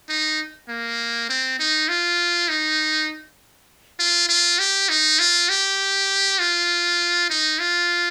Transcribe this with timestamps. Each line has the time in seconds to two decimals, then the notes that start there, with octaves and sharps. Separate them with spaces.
0.09 D#4
0.69 A#3
1.29 C4
1.59 D#4
1.88 F4
2.49 D#4
4.00 F4
4.29 F4
4.59 G4
4.89 D#4
5.19 F4
5.49 G4
6.39 F4
7.30 D#4
7.59 F4